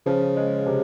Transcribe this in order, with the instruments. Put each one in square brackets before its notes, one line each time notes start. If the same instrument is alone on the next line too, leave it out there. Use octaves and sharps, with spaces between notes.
[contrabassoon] C#3 [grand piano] F3
[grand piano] G#3
C3